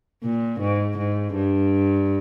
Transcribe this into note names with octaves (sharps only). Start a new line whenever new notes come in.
A#2
G#2
G#2
G2